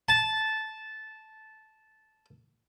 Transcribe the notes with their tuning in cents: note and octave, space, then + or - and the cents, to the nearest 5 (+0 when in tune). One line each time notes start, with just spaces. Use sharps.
A5 -10